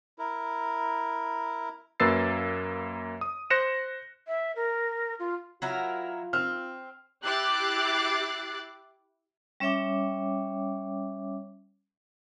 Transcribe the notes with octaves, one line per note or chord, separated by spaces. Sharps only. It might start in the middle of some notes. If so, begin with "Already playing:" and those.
E4 A#4
F#2 A#3 B4 E6 A6 C7
D#6
C5 F#6 A#6 C#7 E7
E5
A#4
F4
F#3 E4 F4 A#4
C4 F6
E4 G4 D6 F#6 A6 C7
G3 C#4 C#5 E5 G5 D6